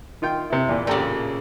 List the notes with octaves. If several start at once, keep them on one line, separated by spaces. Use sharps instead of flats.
D#3 F4 G5
C3 E4
E2 A#2
A1 A#2 C#3 G4 A4